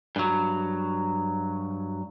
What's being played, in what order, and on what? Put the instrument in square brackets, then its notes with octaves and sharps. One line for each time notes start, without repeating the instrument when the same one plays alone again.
[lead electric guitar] G2 F#3